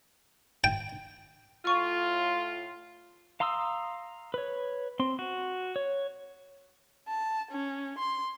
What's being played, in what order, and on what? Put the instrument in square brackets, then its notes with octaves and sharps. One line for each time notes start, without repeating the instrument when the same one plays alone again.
[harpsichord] G5
[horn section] A2 F4 [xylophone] C#6 F6
[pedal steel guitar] F5 A#5 C6 D#6 E6
B4 C#5
C4 C6
F#4
C#5
[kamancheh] A5
C#4
C6